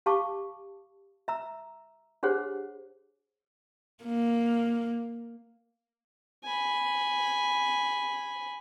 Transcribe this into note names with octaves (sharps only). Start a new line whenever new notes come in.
G4 F5 A5 C#6 D6
E5 A#5 E6
D4 G4 G#4 C5 C#5 F#5
A#3
G#5 B5